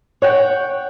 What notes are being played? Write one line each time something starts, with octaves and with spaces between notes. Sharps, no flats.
C#5 F#5 G5